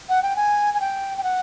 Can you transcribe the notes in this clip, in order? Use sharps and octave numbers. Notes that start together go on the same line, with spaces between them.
F#5
G5
G#5
G#5
G5
G5
F#5